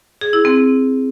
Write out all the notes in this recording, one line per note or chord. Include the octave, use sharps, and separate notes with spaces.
G#4
E4
C4